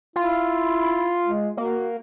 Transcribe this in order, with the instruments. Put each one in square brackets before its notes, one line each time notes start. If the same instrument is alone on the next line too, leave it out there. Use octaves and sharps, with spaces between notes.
[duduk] E4 [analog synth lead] F4
[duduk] G#3
[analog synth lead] A#3 [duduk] F#4